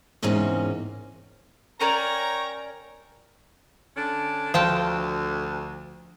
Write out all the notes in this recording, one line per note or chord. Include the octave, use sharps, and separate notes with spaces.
E2 G#2 C3 A#3 C#4
C#4 A#4 C#5 D5 G5 A#5
D3 C#4 D4
D2 F3 G5 A5